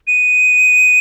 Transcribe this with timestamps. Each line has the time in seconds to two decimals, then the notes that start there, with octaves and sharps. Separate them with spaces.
0.07 D#7